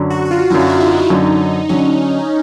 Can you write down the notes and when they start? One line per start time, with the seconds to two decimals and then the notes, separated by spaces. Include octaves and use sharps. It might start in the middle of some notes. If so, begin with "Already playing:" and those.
Already playing: F#2 D3 F#3
0.10 F#4
0.25 F#4
0.31 F4
0.50 F#2 D3 F#3 E4
0.60 F4
0.70 E4
0.80 D#4
1.10 F#2 D3 F#3
1.69 D3 F#3 C#4